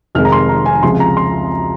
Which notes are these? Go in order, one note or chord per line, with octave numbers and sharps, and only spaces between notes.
F1 F2 D#3 G#3 F6
A#5
C6
A#5
G#5
C#2 C3 F3 G#3 C6
A#5
C6